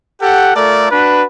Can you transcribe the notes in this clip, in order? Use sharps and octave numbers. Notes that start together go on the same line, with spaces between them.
G4 A4 F#5
A3 F4 A4 A#4 D5
D4 F#4 B4